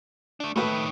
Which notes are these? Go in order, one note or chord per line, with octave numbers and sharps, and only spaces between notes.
A3 D4
A2 D#3 A3 B4